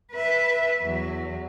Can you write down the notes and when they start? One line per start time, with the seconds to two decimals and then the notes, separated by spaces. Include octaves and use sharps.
0.11 B4 E5
0.81 E2 F#3